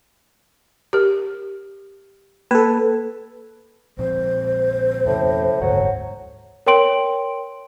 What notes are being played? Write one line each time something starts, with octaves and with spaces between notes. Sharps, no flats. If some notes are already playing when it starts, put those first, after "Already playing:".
G4 A#4
A#3 A4 B4
A#2 F3 C4 C5
F2 A2 C#3
F#1 D2 G#2 F#3
A#4 C#5 G5 C6 D7 F#7